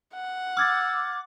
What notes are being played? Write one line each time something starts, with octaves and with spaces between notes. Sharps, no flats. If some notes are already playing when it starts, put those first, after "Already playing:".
F#5
D6 E6 F6 G#6 A6